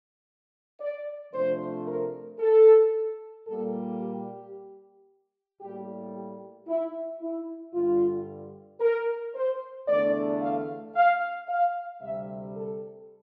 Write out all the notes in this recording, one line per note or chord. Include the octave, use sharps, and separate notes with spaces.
D5
C3 F3 A3 D4 C5
A#4
A4
A#2 G3 A#3 A4
G4
A2 G3 A#3 G4
G4
E4
E4
G2 D3 G3 F4
A#4
C5
E2 D3 A3 D4 D5
F5
F5
F5
D2 C3 G3 E5
A4